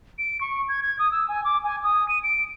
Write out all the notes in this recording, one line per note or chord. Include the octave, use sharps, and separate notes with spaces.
D7
C#6
G#6
G#6
D#6
E6
G#5
D6
G#5
D#6
D#7
D7